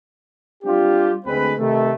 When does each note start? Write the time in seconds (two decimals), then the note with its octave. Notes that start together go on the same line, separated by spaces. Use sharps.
0.63 G3 C4 D4 F4 G4
1.25 D2 G#3 C4 B4
1.57 C3 D#3 A3